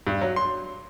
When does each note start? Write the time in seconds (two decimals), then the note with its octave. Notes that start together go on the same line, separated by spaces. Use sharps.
0.07 G2
0.21 F#3
0.36 C6